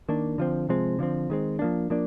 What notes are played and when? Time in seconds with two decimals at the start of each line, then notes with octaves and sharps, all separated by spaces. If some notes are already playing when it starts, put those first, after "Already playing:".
0.09 D#3 A#3 D4
0.38 D3 F3 C4
0.69 C3 F3 G#3 C4
0.99 D3 F3 C4
1.30 D#3 G#3 C4
1.59 F3 A#3 D4
1.90 F3 A#3 D4